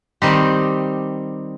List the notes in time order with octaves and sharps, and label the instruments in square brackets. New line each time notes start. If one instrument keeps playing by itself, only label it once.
[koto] D#3 G3 C4 D#4 G4